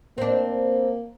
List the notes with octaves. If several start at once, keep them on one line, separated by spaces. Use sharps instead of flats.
A#3 C4 D4